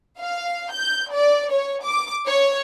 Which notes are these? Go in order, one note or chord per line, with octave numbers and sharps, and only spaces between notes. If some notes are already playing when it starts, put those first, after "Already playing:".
F5
G6
D5
C#5
D6
C#5